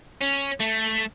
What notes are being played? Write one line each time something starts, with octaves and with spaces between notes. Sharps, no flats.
C#4
A3